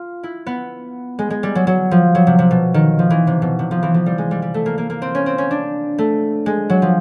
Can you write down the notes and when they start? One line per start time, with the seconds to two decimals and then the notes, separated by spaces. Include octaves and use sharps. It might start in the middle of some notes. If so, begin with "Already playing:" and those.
Already playing: F4
0.23 E4
0.46 B3
1.19 G#3
1.30 G#3
1.43 G3
1.55 F#3
1.67 F#3
1.91 F3
2.15 F#3
2.27 C3
2.39 C3
2.51 B2
2.74 D#3
2.99 F3
3.10 E3
3.27 C3
3.42 B2
3.59 C3
3.71 F3
3.83 E3
3.94 F3
4.06 G3
4.18 G#3
4.31 G3
4.42 G3
4.54 A3
4.66 A#3
4.78 A#3
4.90 A#3
5.02 C4
5.15 C#4
5.26 C4
5.38 C#4
5.51 D4
5.98 A3
6.46 G#3
6.70 F#3
6.82 F3